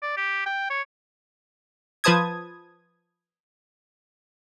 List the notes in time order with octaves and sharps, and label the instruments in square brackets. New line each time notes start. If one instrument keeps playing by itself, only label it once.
[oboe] D5
G4
G5
C#5
[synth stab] F3 B4 C5 A5 D#6 G#6